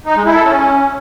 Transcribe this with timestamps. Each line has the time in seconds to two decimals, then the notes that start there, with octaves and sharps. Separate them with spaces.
0.06 D#4
0.16 G#3
0.25 E4
0.35 A4
0.45 C#4